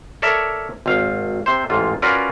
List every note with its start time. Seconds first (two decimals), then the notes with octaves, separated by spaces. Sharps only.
0.22 A4 A#4 C#5 D5 E5
0.86 G#1 F5
1.46 C3 C5
1.70 A1 G#2 F4
2.02 C#4 F4 F#4 A#4 B4 D5